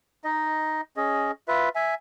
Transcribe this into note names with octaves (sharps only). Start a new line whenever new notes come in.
D#4 D#5
C#4 G#4 D#5
F4 B4 E5
E5 G#5